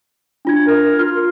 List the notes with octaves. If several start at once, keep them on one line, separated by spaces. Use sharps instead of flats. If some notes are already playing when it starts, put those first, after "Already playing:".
D4 F4 G#6
A#4
F4 F6